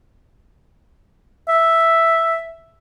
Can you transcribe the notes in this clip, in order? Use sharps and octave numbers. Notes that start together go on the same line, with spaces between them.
E5